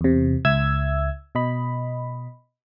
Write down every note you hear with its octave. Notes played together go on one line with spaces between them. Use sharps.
E2 C3
C#2 E5 E6 G#6
B2 D#5 B5